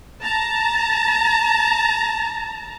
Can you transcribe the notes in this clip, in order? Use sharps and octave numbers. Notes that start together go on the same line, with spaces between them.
A5 A#5